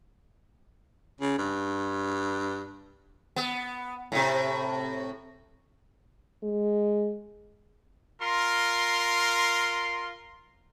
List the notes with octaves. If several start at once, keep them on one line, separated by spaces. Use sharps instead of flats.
C#3
G2
B3
A2 C3
G#3
F4 A#4 C6